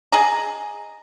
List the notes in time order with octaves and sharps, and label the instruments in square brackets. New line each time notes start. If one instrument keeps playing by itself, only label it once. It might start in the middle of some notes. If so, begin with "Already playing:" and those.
[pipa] G#4 D#5 A#5